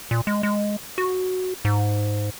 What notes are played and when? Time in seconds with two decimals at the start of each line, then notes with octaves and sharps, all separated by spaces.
0.11 A#2
0.27 G#3
0.43 G#3
0.98 F#4
1.65 G#2